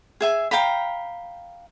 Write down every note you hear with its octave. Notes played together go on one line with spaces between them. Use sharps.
G#4 E5 G#5
F5 G5 A#5 B5